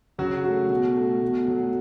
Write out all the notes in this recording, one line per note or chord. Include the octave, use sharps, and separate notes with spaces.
C#3 F#3 F#4
F#3 A3
B2
A3
B2
F#3 A3